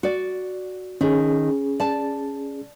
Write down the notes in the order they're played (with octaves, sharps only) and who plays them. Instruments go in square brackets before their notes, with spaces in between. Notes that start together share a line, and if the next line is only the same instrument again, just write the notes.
[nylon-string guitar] F#4 D5
[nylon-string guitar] D#3 [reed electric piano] C#4 G#4
[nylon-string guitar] D5 A5